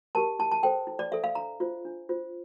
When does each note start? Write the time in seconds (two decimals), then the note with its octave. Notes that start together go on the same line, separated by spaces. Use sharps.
0.15 G4 A#4 A5
0.39 E4 A5
0.51 A5
0.63 A4 C5 G5
0.87 E4
0.99 D5
1.12 A4 C5 E5
1.24 F5
1.35 D4 A#5
1.60 F4 C5
1.85 D4
2.09 F4 C5